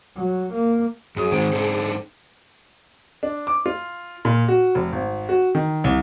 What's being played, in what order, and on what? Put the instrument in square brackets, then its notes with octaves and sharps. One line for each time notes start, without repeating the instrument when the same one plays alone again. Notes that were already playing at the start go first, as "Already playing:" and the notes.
[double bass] F#3
A#3
[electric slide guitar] F#2 [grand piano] F#3 D#6 [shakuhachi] G#4
[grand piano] G#2 C4 D7 [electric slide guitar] D#3 G#3
[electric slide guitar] D4 D#4 A4
[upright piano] D4
D6
F4
A#2
F#4
F1
G#1
F#4
D#3
C2